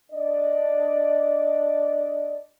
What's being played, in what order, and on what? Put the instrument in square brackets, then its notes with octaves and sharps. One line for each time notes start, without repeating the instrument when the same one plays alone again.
[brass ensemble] D4 D5 D#5